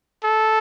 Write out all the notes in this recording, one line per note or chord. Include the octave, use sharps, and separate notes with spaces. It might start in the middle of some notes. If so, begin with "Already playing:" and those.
A4